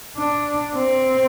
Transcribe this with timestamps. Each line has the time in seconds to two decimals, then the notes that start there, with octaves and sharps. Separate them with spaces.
0.17 D4
0.76 C4